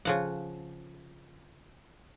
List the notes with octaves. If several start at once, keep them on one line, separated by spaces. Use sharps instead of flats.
C#3 F3 F#5